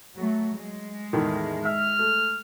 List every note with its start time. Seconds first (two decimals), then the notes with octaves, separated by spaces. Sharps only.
0.15 F#3 A3
0.55 G#3
1.13 E2 A2 D#3
1.65 E5 F6
1.99 A3